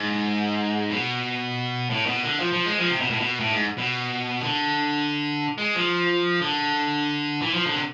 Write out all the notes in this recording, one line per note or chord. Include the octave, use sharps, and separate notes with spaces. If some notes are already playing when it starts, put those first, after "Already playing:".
Already playing: G#2
B2
A2
B2
D3
F3
F3
G#3
F3
C3
B2
A2
B2
A2
G#2
B2
D3
G#3
F3
D3
E3
F3
D3
C3